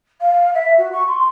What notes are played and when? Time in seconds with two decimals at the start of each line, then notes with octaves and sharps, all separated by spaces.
0.20 F5
0.54 E5
0.77 F#4
0.92 C#6
1.08 C6